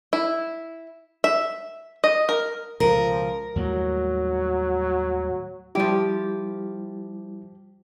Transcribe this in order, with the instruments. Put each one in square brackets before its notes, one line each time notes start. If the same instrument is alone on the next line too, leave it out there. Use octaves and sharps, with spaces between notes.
[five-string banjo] E4
E5
D#5
A#4
[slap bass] C#2 B2 [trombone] F3 [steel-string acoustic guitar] A#4
[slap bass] D#2 A2 G3 [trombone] F#3
[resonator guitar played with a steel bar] F3 G4 [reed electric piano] G3 E4